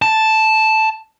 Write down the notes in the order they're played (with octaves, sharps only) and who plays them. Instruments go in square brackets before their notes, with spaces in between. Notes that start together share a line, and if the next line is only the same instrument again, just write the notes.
[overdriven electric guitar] A5